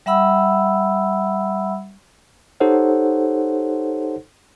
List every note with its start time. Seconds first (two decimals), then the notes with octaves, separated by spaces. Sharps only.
0.06 G3 E5 F#5 B5 E6
2.60 D#4 G4 A4 C5 C#5 F#5